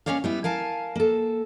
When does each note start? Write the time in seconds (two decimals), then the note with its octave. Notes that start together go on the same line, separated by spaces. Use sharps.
0.06 A#3 B3 C#4 C#5 D5 F5
0.24 G3 B3 E4
0.44 A#4 F5 G#5 A5
0.96 A#3 A4